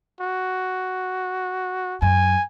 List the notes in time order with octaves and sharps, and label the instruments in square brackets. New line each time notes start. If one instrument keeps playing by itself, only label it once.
[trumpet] F#4
[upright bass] F#2 [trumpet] G#5